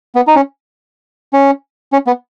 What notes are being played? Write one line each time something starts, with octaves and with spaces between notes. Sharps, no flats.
B3
D#4
C#4
C#4
C#4
B3